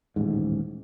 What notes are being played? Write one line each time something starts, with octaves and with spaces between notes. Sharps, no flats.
D#1 A1 G#2